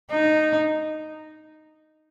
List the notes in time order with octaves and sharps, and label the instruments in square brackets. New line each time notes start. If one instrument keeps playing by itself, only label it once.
[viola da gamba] D#4